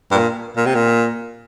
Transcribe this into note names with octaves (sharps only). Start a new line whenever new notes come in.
G2
A#2
A#2
C3
A#2